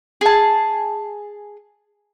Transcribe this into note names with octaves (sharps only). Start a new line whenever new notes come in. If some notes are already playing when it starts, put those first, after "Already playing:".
G#4 A5